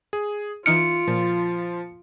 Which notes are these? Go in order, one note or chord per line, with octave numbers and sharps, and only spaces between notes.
G#4
E3 D#4 F4 F6 C#7 D7
A#2 F3